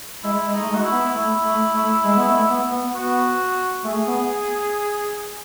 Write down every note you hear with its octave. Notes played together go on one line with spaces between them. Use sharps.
G#3 E4
G#3
D#4
A3
G#3
F#4
E4
B3
A3 E4
A3
A3
G#3
B3
A3
B3
B3
B3 F#4
A3 G#4
B3